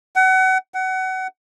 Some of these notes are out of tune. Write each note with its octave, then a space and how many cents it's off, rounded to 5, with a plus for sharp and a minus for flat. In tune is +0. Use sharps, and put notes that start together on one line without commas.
F#5 +30
F#5 +25